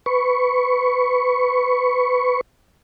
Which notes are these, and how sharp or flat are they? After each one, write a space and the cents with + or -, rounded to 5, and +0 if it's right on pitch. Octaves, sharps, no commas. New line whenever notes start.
B4 +20 C#6 +0